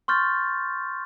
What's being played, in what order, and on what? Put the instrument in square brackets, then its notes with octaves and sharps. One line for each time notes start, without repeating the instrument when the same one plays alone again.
[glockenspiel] C6 C#6 F6 G6 A6